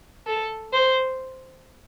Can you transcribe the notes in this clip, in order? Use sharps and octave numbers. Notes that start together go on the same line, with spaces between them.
A4
C5